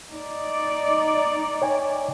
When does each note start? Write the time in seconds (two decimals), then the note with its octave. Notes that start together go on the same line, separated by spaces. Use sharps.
0.11 D#4 D5
1.62 C#5 G5 G#5